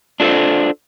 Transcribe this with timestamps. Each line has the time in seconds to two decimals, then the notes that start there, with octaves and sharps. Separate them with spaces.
0.20 D4 F4 A4 B4 C5